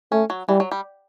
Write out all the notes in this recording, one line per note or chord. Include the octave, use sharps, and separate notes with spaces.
A3 C#4
F#3
E3 G3
F#3
G3